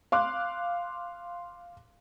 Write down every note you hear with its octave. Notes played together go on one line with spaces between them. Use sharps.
F5 C6 D6 F#6